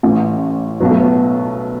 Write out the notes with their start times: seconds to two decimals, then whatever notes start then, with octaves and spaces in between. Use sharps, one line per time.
0.03 A1 A2 E3
0.80 B1 B2 F#3 B3
0.91 A3
1.00 B3